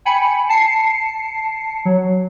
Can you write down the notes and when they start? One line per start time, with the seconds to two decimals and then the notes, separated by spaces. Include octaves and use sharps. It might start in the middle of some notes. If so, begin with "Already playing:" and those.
0.05 G5 G#5 B5 C#7
0.49 A5 C7 C#7
1.85 F#3